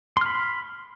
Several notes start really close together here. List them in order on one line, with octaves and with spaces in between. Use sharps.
C6 F6 B5